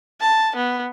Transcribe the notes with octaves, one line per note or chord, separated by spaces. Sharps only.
A5
B3